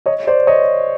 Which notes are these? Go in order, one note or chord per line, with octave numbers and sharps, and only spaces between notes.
C#5 D#5
C5 D5
C#5 D#5